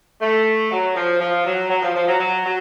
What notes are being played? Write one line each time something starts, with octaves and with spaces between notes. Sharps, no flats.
A3
F#3
F3
F3
F#3
F#3
F3
F3
F#3
F#3
F#3